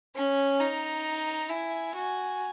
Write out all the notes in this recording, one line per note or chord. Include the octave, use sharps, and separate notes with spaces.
C#4 G#5
D#4 A#5
E4 G#5
F#4 G#5